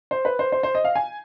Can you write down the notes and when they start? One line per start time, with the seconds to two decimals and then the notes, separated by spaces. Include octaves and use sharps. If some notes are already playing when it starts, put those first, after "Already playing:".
0.11 C5
0.25 B4
0.39 C5
0.52 C5
0.63 C5
0.75 D#5
0.84 F5
0.96 G#5